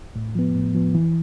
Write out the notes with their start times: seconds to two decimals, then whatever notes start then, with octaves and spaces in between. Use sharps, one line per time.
0.16 A2
0.35 F3 B3
0.55 A2
0.75 F3 B3
0.95 E3